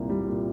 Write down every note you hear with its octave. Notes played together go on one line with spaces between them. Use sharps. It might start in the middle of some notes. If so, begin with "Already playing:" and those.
Already playing: C2 A#2 A#3
G3
A#2